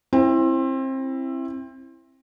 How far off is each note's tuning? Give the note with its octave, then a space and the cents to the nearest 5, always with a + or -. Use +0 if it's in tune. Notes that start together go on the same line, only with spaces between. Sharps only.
C4 +25 E4 +5